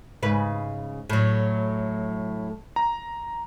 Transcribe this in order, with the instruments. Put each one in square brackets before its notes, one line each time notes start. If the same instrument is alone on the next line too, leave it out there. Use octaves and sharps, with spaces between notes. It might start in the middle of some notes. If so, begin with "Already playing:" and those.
[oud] G#2 C#3 B4
A2 F#3
[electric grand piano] A#5